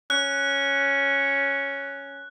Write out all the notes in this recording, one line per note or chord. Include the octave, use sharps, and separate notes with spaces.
C#4 F#6